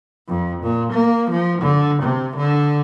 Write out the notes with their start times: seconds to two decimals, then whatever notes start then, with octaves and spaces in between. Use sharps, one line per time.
0.28 F2
0.63 A#2
0.92 A#3
1.30 F3
1.61 D3
2.02 C3
2.36 D3